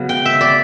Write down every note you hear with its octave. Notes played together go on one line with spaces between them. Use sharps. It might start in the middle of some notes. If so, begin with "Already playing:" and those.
Already playing: C#3 F#3 B3
G5
E5
D5